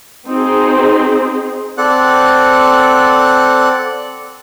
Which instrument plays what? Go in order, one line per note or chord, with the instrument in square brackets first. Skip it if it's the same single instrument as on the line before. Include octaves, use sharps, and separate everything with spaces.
[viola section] C4 D#4 F#4 G#4 C5
[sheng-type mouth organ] C4 A4 D5 F#5 F#6